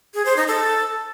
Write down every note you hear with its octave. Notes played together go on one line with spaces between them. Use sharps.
G#4
C5
D#4
A4